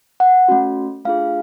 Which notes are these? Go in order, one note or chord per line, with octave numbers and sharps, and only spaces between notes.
F#5
A3 C#4 F#4
A3 D4 F4 G#4 F5